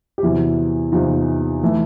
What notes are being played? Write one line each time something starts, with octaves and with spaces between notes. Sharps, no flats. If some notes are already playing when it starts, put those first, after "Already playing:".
G4
E2 C3 E3 E4 F#4
E2 C3 E3 D#4 F4
E3 A3